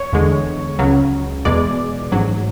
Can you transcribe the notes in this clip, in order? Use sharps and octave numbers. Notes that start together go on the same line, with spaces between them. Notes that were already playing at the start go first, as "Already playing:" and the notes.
Already playing: C#5
E2 D3 G#3
C#2 C#3 F#3
E2 B2 G#3 D5
A1 G#2 F#3